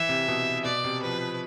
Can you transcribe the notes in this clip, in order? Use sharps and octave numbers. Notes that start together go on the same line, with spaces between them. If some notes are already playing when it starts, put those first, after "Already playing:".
Already playing: E3 E5
C3
B2
B2 D5
C3
F3 B4